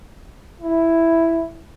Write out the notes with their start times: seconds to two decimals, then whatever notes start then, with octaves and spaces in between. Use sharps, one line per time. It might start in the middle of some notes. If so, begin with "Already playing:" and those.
0.60 E4